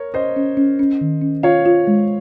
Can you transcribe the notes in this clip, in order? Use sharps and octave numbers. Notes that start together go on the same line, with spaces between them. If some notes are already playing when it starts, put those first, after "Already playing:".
Already playing: A#4 C#5
C#4 C5 D#5
C#4
C#4
C#4
D#3
C#4
F4 C#5 F5
F4
G#3